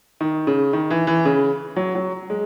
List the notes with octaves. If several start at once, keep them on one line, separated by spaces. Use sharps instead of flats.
D#3
C#3
D#3
E3
E3
C#3
F#3
F#3
G#3